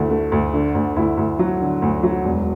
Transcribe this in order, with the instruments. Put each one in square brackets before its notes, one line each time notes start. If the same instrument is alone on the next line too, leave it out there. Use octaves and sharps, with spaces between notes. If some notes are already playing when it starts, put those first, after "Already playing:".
Already playing: [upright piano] D2 D3 A3 E4 F#4
A3
D2
D3
D2
D2 E4
D2
F#3
D3
D2
F#3
E1